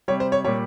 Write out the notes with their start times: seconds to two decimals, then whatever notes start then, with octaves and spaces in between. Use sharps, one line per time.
0.08 C3 G3 C#5
0.20 C5
0.32 C#5
0.45 A#2 G3 C#5